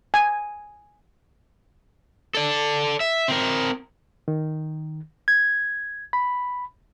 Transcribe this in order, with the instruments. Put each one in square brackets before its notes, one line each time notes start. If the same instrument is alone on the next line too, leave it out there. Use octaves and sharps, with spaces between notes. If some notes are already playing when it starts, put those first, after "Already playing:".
[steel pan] G#5
[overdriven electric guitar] A4 D5
E5
C4 A#4
[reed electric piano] D#3
G#6
B5